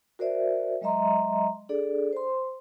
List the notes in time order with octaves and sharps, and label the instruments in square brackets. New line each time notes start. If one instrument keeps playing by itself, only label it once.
[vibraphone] F#4 A#4 C5 D5 E5
F#3 G#3 D#5 E5 A#5 C6
D4 G#4 A4 D5
C5 C6